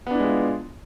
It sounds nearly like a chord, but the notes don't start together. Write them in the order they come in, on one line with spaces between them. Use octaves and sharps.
B3 D4 E4 G#3 F4